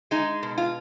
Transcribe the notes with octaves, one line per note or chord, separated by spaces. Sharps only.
G#3 D#4
B2
F4